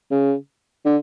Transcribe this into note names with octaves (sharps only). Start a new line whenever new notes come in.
C#3
D3